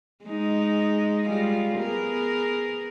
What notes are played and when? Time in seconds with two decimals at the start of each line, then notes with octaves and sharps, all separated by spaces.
0.25 G#3 D#4
1.27 G3 G#3 F4
1.78 B3 G#4 A#4